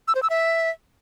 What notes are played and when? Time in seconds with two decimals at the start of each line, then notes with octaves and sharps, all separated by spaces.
0.08 E6
0.15 C5
0.23 E6
0.30 E5